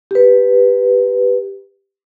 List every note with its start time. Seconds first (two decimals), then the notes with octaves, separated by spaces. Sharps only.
0.11 G4 B4